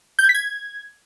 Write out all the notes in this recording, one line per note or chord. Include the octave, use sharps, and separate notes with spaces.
G6
G#6
B6
G#6